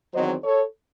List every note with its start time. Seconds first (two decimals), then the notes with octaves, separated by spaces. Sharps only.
0.14 E2 D#3 F#3 C4 C5 D#5
0.44 A4 C#5